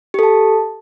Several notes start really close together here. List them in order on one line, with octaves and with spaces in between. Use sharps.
G4 A4 A5